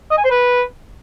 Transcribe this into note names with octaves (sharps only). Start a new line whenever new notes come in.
D#5
G#5
C5
B4